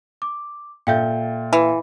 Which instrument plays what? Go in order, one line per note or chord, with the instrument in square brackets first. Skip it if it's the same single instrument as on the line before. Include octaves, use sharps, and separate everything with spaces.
[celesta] D6
[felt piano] A#2 A4 G6 [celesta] E5 F5 G5
[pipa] E3